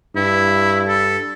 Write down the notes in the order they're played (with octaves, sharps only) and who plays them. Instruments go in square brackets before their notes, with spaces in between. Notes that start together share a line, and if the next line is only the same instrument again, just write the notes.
[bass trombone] G2 [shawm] E4
[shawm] A4